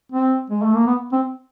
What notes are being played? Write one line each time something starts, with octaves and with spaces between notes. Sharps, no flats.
C4
G#3
A3
A#3
B3
C4